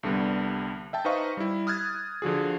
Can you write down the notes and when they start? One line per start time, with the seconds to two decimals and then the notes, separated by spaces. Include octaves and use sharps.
0.03 C2 D3 G3 B3
0.93 E5 G5 A5
1.05 D#4 B4 C5 D#5 F5 C#6
1.37 G3 E4
1.67 D#6 F6 F#6 G#6 A6
2.22 D3 F3 F#4 G#4